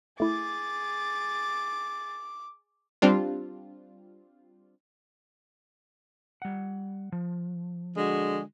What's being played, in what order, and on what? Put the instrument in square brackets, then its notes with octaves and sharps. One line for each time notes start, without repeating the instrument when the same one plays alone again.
[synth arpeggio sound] A3 E4 [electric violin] G#4 A6 [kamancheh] D6
[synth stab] G3 C4 D4 F4
[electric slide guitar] G3 F#5
F3
[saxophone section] D3 G#3 F#4